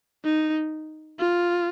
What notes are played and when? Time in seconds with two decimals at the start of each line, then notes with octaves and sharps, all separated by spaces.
0.24 D#4
1.19 F4